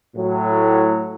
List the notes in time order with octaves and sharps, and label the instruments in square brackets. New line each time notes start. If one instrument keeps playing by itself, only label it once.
[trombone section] A2 F#3